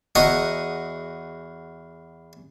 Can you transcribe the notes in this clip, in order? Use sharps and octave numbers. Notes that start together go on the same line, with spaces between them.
E2 F#4 G#4 D#5 A#5